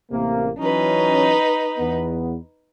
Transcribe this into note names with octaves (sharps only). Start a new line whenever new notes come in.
A1 C3 A#3
E3 F#3 C#4 D#4 B4
E2 B3